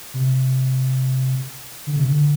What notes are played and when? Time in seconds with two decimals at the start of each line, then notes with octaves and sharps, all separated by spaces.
0.14 C3
1.87 D3
1.96 C3
2.07 D3